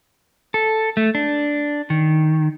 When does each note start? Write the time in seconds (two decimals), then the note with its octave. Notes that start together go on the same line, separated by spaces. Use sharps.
0.54 A4
0.97 A3
1.15 D4
1.90 D#3